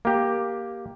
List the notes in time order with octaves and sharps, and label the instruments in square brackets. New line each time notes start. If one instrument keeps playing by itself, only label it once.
[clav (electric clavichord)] A#3 G4